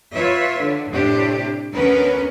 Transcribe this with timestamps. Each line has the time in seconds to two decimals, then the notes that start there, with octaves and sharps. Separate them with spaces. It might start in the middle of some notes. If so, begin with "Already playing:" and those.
0.15 F4 B4 C#5 E5
0.59 D3
0.91 A2 C3 D4 G4
1.74 D2 B3 C#4 A#4 B4